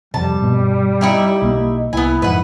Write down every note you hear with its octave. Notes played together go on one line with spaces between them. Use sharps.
F2 C3 G3 A5
G2 B2
D#4 E4 G4
B1 A#3
C2 B3 E4 G#5
F2 G#2 B4 F#5